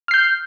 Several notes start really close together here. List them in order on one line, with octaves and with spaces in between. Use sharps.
F6 C7 G6